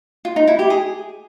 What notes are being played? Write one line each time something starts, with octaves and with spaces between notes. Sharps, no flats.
F4
D#4
E4
G4
G#4